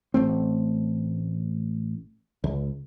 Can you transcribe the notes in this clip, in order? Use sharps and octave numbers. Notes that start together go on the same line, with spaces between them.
A1 A3 C4
C#2